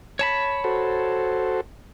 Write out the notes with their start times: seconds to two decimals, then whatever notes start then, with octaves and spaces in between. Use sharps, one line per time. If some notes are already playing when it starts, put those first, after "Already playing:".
0.19 C#5 A5 B5
0.64 F#4 A4 C5